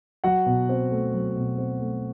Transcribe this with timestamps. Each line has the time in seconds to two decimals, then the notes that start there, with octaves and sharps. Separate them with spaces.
0.24 F#3 F#4 F#5
0.46 B2
0.69 C4
0.91 A3
1.14 F#3
1.36 B2
1.58 C4
1.80 A3